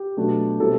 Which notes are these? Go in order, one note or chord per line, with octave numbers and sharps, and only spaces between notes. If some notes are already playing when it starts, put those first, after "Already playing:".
Already playing: G4
B2 F#3 A3 D4
B2 G3 C4 E4 A4